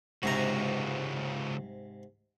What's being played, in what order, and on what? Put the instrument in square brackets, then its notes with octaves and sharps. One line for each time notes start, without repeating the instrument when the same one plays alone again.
[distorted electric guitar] C#2 F#4 [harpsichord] G#2 C3 A#5